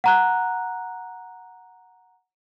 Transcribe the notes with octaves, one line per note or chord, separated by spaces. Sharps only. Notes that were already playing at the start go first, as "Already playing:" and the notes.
F#5 A#5 F#6